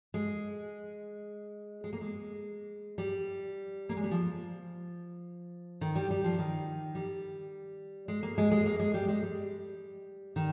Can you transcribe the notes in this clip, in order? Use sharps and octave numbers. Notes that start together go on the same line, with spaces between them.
G#3
G#3
A#3
G#3
G3
A#3
G#3
G3
F3
D#3
G3
G3
F3
D#3
G3
G#3
A#3
G#3
G#3
A#3
G#3
G3
G#3
G3
D#3